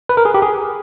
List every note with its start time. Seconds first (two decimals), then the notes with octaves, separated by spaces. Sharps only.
0.09 B4
0.17 A#4
0.25 G#4
0.34 G4
0.42 G#4